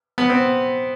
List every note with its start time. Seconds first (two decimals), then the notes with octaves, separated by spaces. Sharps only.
0.18 B3
0.30 C4